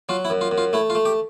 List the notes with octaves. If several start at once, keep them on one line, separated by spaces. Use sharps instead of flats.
F#3 F4
E4
F#2
F4
F#2
F4
A3 E4
F4
A3
G4